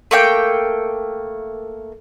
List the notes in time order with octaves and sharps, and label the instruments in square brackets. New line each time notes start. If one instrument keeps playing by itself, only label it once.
[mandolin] A3 A#3 G5